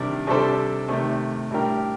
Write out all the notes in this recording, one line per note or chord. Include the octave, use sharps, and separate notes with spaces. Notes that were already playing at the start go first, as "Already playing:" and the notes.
Already playing: C3 D#3 G3 D4
C3 G3 D4 A4 C5
C3 D#3 A3
A2 G3 D4 G4 A#4